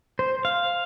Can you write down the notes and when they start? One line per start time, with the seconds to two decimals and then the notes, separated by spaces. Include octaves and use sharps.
0.19 C5
0.45 F5